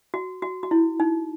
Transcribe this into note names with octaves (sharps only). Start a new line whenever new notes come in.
F#4
F#4
F#4
E4
D#4